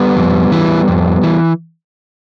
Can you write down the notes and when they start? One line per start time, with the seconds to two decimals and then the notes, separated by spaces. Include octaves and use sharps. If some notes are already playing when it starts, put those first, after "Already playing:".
Already playing: G3 B3
0.16 F2
0.52 E3
0.88 F2
1.23 E3